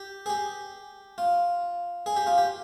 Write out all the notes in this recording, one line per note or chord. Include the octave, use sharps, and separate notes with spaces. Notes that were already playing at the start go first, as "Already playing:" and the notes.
Already playing: G4
G#4
G4
F4
G#4
G4
F4
G4